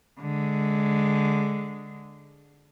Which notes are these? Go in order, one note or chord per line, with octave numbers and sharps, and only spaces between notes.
D3 G#3